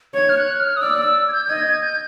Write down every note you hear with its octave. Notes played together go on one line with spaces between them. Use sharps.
C#5 G#6
F6
F#6
F6
D#6
D5 E6
E6
G#6
G6
G6
D#5 G#6
G#6
G6